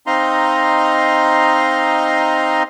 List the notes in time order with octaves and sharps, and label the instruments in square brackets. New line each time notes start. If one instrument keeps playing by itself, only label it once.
[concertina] C4 D#4 D#5 F5 A#5 C6